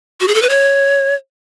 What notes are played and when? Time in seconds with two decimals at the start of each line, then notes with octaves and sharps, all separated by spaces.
0.20 F#4
0.28 G#4
0.35 A4
0.42 B4
0.49 C#5